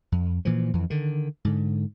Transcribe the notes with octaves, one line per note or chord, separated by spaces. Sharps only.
F2
A#2 E3 F3
F2 E3
D3 D#3
G#2 D3